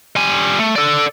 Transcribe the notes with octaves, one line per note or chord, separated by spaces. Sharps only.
G3 G#5
A3
A4 D5